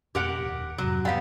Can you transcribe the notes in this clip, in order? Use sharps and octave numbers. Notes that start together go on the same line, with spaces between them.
F2 B2 A#3 G4 A#4 F#5
D#1
F2 G#2 C3 F#3
G3 B3 F5 F#5